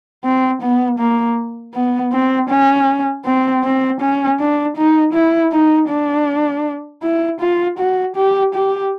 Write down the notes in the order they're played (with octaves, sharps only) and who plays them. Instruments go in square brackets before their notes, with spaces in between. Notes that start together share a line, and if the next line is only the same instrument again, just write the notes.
[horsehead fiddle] C4
B3
A#3
B3
C4
C#4
C4
C4
C#4
D4
D#4
E4
D#4
D4
E4
F4
F#4
G4
G4